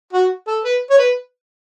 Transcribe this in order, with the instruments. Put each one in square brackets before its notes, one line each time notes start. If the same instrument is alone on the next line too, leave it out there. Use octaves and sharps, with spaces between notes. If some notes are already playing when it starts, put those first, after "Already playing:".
[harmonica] F#4
A4
B4
C#5
B4